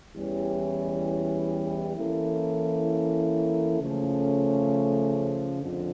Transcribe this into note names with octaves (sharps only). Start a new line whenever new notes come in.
E2 E3 G3 C#4
E3 A#3 C#4 E4 A4
C#3 F3 A3 C#4
F2 D3